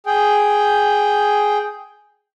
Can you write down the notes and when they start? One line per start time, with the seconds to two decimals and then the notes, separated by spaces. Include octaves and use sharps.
0.06 G#4 G5